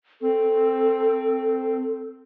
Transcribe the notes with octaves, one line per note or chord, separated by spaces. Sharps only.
C4 A4